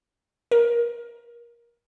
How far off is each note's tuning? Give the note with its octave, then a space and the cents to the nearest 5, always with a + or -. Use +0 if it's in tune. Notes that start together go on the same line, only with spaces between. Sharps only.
A#4 +20